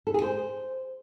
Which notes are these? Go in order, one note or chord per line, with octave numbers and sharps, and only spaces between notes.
A4
G#4
C5